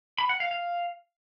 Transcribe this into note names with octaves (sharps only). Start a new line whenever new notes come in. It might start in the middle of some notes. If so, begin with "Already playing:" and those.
B5
F#5
F5
F5